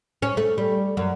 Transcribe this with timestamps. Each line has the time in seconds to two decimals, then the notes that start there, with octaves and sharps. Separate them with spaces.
0.22 C#4
0.37 A3
0.58 G3
0.97 F#2